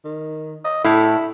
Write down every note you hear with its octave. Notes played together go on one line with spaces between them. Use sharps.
D#3
D#5
A2 E4